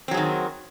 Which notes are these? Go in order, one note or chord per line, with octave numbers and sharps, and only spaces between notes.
D#3 F#3 C4 G#4